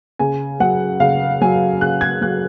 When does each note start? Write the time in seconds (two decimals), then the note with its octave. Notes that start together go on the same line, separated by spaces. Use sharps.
0.19 C#3 G#5
0.60 F#3 F#5
1.00 C#3 F5
1.41 F#3 G#5
1.81 C#3 F#6
2.01 G#6
2.21 F#3 F#6